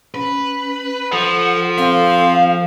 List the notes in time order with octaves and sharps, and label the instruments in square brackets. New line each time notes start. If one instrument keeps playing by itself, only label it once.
[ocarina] C#4 [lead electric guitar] B4
[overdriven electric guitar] F3 [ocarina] A4 [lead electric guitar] F#5
[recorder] C4 [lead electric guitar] F5